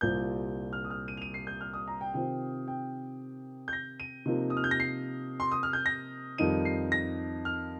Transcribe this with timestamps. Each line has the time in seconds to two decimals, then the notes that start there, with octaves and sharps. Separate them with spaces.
0.01 C2 A#2 G3 C4 F4 G6
0.73 F6
0.84 D#6
0.90 F6
1.08 D#7
1.17 F7
1.22 D#7
1.34 C7
1.47 G6
1.61 F6
1.74 D#6
1.88 A#5
2.01 G5
2.14 C3 D#3 C4 F4 G5
2.68 G5
3.68 G6
3.73 A#6
4.00 D#7
4.26 C3 F3 A#3 D#4
4.50 D#6
4.57 F6
4.64 G6
4.71 A#6
4.80 C7
5.40 C6
5.51 D#6
5.63 F6
5.73 G6
5.86 A#6
6.38 F2 D#3 G3 D#4 D#7
6.65 C7
6.92 A#6
7.45 F6